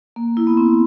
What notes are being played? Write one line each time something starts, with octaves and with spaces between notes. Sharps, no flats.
A#3
E4
B3
C4